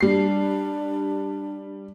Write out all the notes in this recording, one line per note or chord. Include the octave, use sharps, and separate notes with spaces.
G3 D4 C7